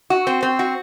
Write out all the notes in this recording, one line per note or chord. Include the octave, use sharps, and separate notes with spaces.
F#4
C4
C4
F#4